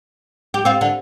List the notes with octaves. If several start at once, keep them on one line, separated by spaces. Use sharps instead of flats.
G4
C4 F4
D3